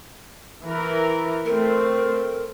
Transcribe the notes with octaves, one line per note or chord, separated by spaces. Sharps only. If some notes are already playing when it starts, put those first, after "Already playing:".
E3 A#4
A3 C4 A#4